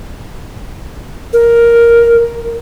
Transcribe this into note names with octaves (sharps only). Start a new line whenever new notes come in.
A#4